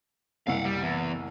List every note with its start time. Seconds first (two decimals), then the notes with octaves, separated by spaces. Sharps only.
0.47 F#1 C2 F5 F#5
0.65 G3
0.82 E2